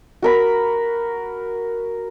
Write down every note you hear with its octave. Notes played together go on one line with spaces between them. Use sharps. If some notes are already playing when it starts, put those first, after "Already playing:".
F#4 A#4 B5